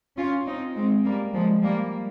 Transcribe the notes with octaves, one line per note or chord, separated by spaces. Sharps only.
C#4 F4
C4 D#4
G#3 C4
G3 A#3
F3 G#3
G3 A#3